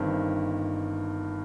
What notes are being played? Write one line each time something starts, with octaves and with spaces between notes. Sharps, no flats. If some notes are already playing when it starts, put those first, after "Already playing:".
Already playing: G1 G2 D#3 C4